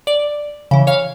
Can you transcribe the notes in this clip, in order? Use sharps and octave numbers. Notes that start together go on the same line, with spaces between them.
D5
C#3 E3
C#5 F5